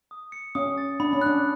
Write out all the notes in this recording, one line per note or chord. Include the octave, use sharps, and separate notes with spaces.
D#6
C#7
C#4 D#6
A6
D4 B5
C#4
D4 F#6